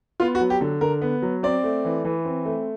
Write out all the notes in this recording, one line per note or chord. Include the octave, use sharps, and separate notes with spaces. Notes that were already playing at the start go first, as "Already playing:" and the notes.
B3 F4
F#4
F#3
G4
D3
D3 A#4
B3
F#3
C4 D5
A3
E3
E3
C4
A3